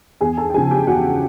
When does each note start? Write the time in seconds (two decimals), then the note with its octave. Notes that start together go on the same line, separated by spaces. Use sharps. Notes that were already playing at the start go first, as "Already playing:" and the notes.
0.21 E2 G#4 G#5
0.38 A4 A5
0.50 G5
0.54 C#3 F3 G#4 G#5
0.71 G4 G5
0.87 E2 F#4 F#5